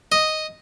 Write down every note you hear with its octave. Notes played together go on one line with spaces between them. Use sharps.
D#5